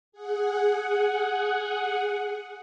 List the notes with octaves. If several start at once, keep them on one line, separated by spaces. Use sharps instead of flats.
G#4 F#5